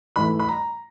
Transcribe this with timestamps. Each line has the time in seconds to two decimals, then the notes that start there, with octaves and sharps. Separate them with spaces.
0.16 G#2 E3 A3 B5
0.39 B5
0.49 A#5